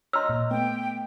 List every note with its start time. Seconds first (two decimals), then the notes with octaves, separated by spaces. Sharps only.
0.13 C#5 D#5 A#5 C6 E6 F6
0.29 A#2
0.51 A3 B3 G5